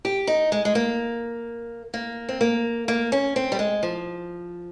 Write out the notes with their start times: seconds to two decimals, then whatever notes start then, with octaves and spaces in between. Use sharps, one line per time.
0.05 G4
0.27 D#4
0.52 G#3
0.65 G#3
0.75 A#3
1.94 A#3
2.29 C4
2.41 A#3
2.88 A#3
3.12 C#4
3.36 C4
3.52 G3
3.59 G#3
3.83 F3